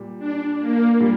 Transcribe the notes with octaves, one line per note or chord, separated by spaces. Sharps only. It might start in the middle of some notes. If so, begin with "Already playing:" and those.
Already playing: A#2 G3
D4
A#3
A#2 G3